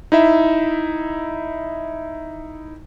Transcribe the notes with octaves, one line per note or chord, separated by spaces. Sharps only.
D#4 E4 E5